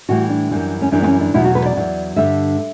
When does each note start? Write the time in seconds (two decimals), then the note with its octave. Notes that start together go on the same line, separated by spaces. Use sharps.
0.09 A2 E3 G3 F#4
0.29 D4
0.51 F#2 E3 G3
0.82 C#4
0.91 F#2 E3 G3 D4
1.02 B3
1.07 C#4
1.20 D4
1.34 E2 B2 F#3 E4
1.45 F#4
1.55 B4
1.65 D5
1.76 E2 B2 F#3
2.16 G2 D3 G3 E5